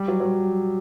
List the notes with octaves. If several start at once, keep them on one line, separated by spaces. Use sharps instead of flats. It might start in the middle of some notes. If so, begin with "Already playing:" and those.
Already playing: G3
F#3
F#3
G3